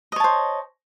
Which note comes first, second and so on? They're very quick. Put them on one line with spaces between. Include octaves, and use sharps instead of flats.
D#5 C#5 A5 C5